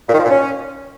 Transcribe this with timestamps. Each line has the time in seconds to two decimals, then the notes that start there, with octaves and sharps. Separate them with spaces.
0.09 A#2
0.14 D#3
0.19 F3
0.25 A#2
0.30 C#4